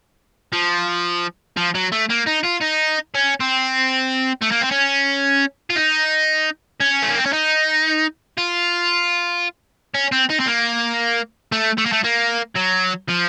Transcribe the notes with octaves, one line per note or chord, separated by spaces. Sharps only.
F3
F3
F#3
A3
A#3
D#4
F4
D#4
C#4
C4
A3
A#3
C4
C#4
F4
D#4
C#4
A3
A#3
C4
C#4
D#4
F4
C#4
C4
D#4
C4
A#3
A3
A3
A#3
A3
A#3
F#3
F3